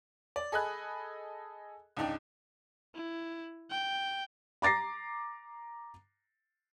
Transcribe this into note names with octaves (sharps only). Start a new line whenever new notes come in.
D5
G#4 A4 D#5 G#5 B5 F#6
C#2 G#2 D4 D#4 G5
E4
G5
A#5 D6 A6 A#6 C7